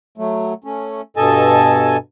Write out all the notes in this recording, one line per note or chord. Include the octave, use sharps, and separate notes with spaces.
F#3 A3
A3 C#4
G2 B2 A4 D#5 G#5 A5